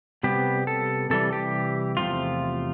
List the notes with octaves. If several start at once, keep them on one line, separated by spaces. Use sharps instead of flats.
C3 G3 B3 G4
A4
C3 E3 G3 A4
G4
E2 C3 F3 A3 C4 F4